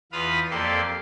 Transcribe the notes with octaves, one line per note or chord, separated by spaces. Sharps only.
E2 F4 B4 F5 B5 D#6
F2 A#3 G4 A4 D5 C6